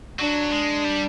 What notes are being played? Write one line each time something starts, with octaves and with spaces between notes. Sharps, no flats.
F#3 D4
G#3
G3